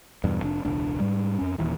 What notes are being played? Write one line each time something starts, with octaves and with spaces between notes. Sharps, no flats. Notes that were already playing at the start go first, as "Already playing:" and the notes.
E2 G2 B2
F1 D4
E1 C#2 D4
G#2 G3
F2 C#4
D#1 D#2 E3